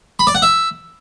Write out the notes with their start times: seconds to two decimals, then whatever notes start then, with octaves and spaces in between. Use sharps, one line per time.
0.19 B5
0.27 D5
0.35 F#5
0.42 E5